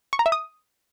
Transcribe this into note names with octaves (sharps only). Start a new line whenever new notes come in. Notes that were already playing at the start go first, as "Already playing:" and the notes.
C#6
A#5
E5
D#6